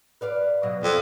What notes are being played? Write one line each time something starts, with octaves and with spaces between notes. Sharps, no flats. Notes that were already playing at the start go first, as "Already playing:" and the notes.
B4 D5 F5
B2 F#3 D#5
F2